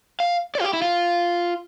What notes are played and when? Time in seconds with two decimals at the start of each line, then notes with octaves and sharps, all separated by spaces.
0.20 F5
0.55 D5
0.61 F4
0.65 G4
0.73 E4
0.82 F4